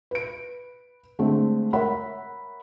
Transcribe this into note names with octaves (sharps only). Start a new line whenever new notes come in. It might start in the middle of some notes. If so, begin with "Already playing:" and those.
B4 D7
D3 G#3 A3 C4
A#4 C#5 E5 F#5 B5